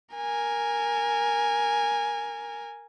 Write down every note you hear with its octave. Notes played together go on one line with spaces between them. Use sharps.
A#4 G#5